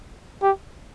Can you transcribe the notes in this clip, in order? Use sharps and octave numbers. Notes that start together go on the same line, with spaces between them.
G4